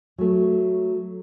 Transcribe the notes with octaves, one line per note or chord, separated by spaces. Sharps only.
F#3 A3